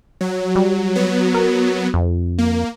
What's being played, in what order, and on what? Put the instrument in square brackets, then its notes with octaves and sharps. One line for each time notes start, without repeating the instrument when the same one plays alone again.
[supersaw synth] F#3
[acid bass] G3
[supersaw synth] F#3 B3
[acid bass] A#4
F2
[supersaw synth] A#3